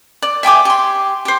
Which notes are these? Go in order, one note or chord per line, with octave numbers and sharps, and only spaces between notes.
D5
E5 G5 G#5 D6
G4 C6
G4 C5